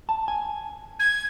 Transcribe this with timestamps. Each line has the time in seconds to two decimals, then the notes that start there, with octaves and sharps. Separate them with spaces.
0.09 A5
0.28 G#5
0.99 G#6